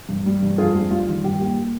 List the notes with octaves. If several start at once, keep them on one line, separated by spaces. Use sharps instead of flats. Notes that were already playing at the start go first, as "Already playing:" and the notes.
G2
G3
G2
F2 F4 G#4
G3
G3 F4
D#3
G2 G4
A#3